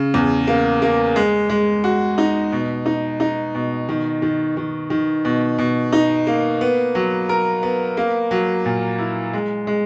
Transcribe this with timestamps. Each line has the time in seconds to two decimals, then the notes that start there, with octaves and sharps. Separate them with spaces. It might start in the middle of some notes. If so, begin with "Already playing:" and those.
Already playing: C#3
0.14 E2
0.47 A#3
0.82 A#3
1.16 G#3
1.50 G#3
1.84 F#4
2.18 D#4
2.52 B2
2.86 D#4
3.20 D#4
3.55 B2
3.89 D#3
4.22 D#3
4.57 D#3
4.90 D#3
5.25 B2
5.58 B2
5.93 D#4
6.27 A#3
6.61 B3
6.95 F#3
7.29 A#4
7.63 B3
7.97 A#3
8.31 F#3
8.65 A#2
8.99 E4
9.33 G#3
9.67 G#3